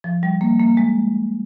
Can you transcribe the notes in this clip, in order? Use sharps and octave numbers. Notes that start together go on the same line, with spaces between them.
F3
G3
A#3
A#3
G#3